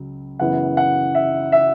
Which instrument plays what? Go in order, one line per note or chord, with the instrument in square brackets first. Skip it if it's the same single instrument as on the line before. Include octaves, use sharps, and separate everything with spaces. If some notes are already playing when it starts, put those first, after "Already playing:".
Already playing: [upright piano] C#2 C#3 F#3
F#2 C#3 E3 B3 E4 F#5
F#5
E5
E5